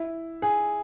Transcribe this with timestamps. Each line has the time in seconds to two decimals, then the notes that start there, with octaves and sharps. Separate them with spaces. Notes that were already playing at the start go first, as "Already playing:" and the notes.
Already playing: E4
0.42 G#4